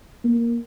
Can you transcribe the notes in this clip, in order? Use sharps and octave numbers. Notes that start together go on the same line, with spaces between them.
A#3